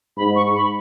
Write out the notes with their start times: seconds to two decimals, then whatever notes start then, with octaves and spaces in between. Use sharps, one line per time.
0.17 G#2 B5
0.36 C#6
0.55 B5